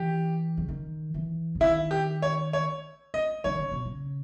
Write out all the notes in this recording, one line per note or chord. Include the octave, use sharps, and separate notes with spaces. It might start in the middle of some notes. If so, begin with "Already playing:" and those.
Already playing: E3 G4
C#3
D#3
E3
C#3
D#3 E4
G4
C#5
C#5
D#5
D#3 C#5
C#3
B2
C#3